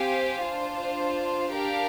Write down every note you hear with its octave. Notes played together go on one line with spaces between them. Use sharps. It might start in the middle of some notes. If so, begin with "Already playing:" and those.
Already playing: C4 G4 C5 F5 G#5
D4 F4 C5
D4 G4 A#4 F5